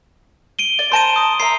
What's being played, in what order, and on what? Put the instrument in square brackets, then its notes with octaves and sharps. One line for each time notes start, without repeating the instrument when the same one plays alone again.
[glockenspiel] D7 D#7 G7
[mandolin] D5
[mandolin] C5 A5 A#5 [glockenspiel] C6 D7 D#7
[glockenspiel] D#6
[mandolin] E5 A#5 [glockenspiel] C7